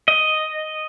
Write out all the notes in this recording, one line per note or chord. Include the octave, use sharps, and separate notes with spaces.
D#5